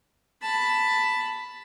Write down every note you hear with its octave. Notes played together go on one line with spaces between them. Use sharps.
A5 B5